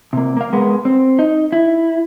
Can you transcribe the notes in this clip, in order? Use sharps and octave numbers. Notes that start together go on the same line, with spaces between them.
C3 A#3
A#3 F5
G#3 B3 A#4
C4
D#4
E4